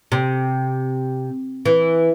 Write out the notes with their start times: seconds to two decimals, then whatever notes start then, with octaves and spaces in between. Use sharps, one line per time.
0.12 C3
1.66 E3